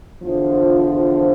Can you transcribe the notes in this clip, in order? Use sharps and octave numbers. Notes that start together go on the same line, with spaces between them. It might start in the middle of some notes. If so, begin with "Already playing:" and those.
E2 D3 F3